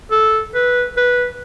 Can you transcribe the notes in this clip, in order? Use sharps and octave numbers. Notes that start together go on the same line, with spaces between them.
A4
B4
B4